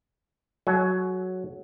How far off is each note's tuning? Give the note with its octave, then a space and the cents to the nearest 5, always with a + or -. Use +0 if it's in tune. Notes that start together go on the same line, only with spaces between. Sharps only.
F#3 +0 G#4 +45